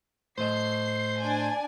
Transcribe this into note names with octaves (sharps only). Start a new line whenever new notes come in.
A2 A3 C5 D#5 C7
D4 D5 G#5